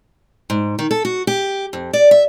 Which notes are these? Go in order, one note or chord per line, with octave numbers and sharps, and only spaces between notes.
G#2
D#3
A4
F#4
G4
F2
D5
E5